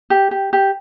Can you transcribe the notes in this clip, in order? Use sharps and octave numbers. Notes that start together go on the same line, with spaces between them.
G4
G4
G4